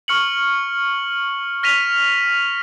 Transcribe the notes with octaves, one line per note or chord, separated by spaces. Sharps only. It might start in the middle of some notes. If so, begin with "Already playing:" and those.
C#6 F6 C#7 F#7
F6 A#6 B6 D#7 F7